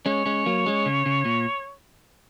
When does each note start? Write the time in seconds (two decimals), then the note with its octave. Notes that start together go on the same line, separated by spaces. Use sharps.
0.06 G#3 C#4 C#5
0.26 G#3 C#4
0.46 F#3 A#3
0.66 G#3 C#4
0.86 C#3
1.06 C#3
1.25 A#2